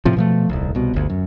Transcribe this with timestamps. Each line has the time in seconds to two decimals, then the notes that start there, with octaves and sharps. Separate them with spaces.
0.05 A2 C3 F3
0.17 B2 F3 A3
0.49 D#1 C2
0.75 C2 B2
0.94 G1 D2
1.10 F#2